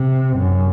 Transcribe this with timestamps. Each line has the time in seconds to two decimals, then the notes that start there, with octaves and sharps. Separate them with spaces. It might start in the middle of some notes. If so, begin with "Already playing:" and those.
Already playing: C3
0.37 F#2